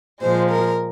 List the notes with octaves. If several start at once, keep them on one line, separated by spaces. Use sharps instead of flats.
A#2 F3 G#3 C5
A#4